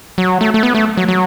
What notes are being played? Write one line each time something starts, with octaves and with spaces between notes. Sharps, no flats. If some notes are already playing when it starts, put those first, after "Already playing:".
F#3
A3
A3
B3
A3
F#3
F#3